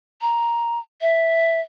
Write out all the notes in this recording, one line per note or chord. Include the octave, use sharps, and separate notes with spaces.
A#5
E5